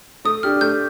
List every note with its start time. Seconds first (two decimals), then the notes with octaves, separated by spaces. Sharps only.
0.25 A3 D#6
0.43 D4 G4 F6
0.61 A3 G6